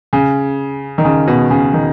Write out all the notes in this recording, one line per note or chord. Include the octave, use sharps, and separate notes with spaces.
C#3
D#3
C#3
B2
C#3
D#3